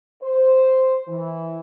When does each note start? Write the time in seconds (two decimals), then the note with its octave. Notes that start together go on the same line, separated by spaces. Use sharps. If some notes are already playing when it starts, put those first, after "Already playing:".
0.22 C5
1.08 E3